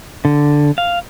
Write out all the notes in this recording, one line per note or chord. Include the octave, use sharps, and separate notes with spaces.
D3
F5